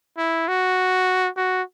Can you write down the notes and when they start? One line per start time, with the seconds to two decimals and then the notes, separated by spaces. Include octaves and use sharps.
0.18 E4
0.48 F#4
1.37 F#4